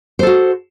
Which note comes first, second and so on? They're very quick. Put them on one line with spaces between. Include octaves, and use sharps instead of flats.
C5 A4 F#4